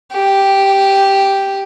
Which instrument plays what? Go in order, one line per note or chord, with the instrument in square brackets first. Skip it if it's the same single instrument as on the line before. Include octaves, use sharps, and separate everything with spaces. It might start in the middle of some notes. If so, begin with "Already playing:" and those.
[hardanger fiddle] G4